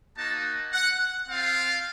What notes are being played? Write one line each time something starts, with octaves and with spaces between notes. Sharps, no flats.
A#3 D#4 F#4 A5
F#5
C4 F4 F5